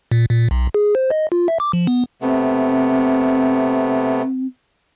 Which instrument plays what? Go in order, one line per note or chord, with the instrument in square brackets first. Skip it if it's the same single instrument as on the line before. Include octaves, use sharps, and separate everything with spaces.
[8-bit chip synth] A#2
A#2
B1
G#4
C5
D#5
F4
E5
D6
F3
B3
[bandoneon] C3 A3 B3 [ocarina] C4